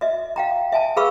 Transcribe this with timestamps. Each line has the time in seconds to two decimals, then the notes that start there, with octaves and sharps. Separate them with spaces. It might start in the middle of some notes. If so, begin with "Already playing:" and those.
0.01 D#5 E5
0.36 F5 G5 A#5
0.72 E5 G#5 A5
0.97 G#4 B4 F5 B5 C#6 E6